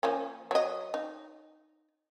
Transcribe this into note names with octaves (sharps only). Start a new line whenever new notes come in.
F3 A#3 C#4
F#3 D#5
D#4